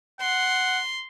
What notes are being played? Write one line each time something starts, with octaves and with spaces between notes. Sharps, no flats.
F#5 C6